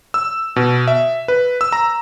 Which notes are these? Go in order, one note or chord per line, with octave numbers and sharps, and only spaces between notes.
E6
B2
E5
B4
E6
A#5